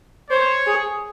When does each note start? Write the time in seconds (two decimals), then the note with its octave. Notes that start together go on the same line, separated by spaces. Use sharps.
0.30 C5 C#5
0.66 G#4